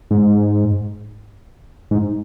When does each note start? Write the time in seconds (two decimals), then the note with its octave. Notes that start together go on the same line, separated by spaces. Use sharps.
0.11 G#2
1.91 G#2